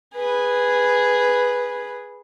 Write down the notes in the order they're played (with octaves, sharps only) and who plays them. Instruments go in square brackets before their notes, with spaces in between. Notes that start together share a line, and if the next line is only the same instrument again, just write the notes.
[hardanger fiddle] G#4 B4